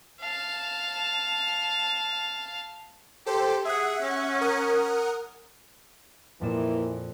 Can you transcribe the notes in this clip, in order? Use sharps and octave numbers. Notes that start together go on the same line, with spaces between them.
F5 A5
G4 A4 C5
G#4 E5 F#5
C#4
A#4 F#5 D#6
F2 A#2 E3 A#3 E4 E7